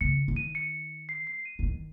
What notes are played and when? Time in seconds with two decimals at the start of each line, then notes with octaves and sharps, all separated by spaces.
0.01 C#3 C#7
0.28 D#3
0.36 D#7
0.55 C#7
1.09 C7
1.27 C7
1.45 D#7
1.59 C#3
1.63 D#3